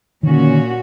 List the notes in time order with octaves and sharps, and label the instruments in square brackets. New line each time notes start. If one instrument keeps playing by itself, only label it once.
[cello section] A#2 C#4 F#4 [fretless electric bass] D3 D#3